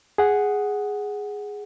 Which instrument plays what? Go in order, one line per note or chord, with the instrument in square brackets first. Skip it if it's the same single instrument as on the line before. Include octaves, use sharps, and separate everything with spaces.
[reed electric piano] G#4 F#5